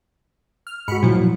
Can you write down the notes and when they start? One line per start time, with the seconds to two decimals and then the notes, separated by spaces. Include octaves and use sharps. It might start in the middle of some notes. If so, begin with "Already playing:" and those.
0.67 F6
0.88 G#2 G#3 F#4 B5 C#7
1.03 A#2 F3 F#3 E4